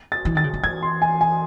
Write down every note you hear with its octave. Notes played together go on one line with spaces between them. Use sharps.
A6
E3
D#3 A6
C#3
D#3
E3 G#6
C6
G#5
G#5